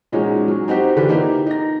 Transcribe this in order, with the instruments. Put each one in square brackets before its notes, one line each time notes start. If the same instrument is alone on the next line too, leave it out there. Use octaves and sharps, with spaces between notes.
[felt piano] A#2 F3 G#3 C#4 D#4 F#4
F#3
C4 D#4 F#4 G4 C5
D3 E3 F4 G4 A4 B4
A#3 D#4 E4 G4
D#4 A#6